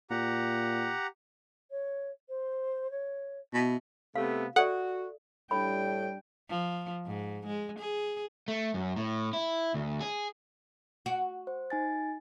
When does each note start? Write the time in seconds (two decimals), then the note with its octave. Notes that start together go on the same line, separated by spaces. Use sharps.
0.10 A#2 G4 F#5 A#5
1.70 C#5
2.28 C5
2.90 C#5
3.54 B2 E4
4.16 C3 A3 B3 F5
4.56 F#4 A4 D5 E5 F#5
5.51 A2 G3 D4 G5 B5
6.50 F3
7.06 G#2
7.46 G#3
7.79 G#4
8.48 A3
8.74 F#2
8.96 A2
9.33 E4
9.74 D2
10.01 G#4
11.06 F#4
11.47 C5
11.70 D#4 G#5 A6